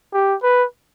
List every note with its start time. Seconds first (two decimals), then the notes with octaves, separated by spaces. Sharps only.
0.14 G4
0.43 B4